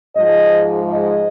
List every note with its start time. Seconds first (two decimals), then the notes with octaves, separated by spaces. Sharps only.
0.16 G#2 F3 G#3 D#5
0.90 D#5